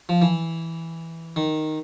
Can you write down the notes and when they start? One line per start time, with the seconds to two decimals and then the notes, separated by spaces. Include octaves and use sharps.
0.09 F3
0.22 E3
1.36 D#3